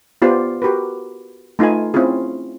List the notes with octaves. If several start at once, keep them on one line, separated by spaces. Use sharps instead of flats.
B3 F4 G4 C5 D5
F#4 G4 A#4 B4
A3 D#4 F4 B4 G#5
C4 C#4 E4 F4 G#4